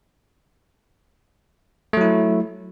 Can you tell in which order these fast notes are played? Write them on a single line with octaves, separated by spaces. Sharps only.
A3 F#3 E4